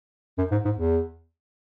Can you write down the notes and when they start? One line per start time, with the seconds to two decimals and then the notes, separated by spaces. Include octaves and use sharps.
0.38 F#2
0.51 G#2
0.65 G#2
0.78 E2